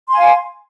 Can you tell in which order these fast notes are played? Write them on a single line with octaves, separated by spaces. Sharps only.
C6 G#5 F5